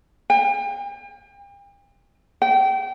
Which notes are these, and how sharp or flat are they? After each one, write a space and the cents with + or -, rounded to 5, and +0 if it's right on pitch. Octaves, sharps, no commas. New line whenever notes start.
G5 +40
G5 -30